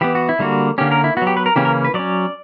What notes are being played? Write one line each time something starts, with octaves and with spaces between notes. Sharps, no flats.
E3 B3 G4
F#4
E4
D3 G3 A#3 F#4
D3 A#3 C#4 G4
A#4
E4
F#3 B3 F#4
G4
B4
A#4
C#3 E3 A#3 C#4 G4
A#4
B4
F#3 C#4 D5